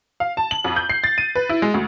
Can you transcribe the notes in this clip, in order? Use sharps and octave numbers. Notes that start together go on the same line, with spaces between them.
F5
A5
F#7
F2
G6
C7
A6
D#7
B4
E4
G#3
D2